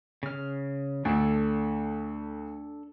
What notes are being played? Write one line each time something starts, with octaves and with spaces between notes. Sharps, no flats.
C#3 F6
D2 D4 A4